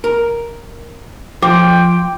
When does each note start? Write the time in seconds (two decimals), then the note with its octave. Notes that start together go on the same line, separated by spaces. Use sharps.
0.04 A#4
1.43 F3 G5 D6